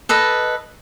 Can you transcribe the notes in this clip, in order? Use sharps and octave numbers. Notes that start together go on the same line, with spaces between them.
A4 B4 D#5